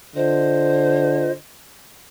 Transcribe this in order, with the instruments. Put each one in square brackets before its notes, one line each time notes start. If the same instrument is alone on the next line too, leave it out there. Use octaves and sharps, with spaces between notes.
[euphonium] D3 [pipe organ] F4 D#5 [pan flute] C5